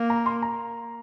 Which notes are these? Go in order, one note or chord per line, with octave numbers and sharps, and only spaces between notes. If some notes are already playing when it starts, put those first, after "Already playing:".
Already playing: A#3
A#5
C6
A#5